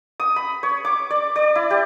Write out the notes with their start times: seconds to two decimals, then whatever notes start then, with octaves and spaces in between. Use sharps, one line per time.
0.20 D#6
0.36 B5
0.63 C#5
0.85 D6
1.10 D5
1.36 D5
1.55 E4
1.70 G4